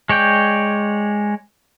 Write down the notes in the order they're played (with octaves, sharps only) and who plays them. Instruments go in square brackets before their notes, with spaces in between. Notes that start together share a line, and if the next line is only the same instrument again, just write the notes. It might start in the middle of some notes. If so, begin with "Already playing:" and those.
[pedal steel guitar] G#3 C#5 D5 G5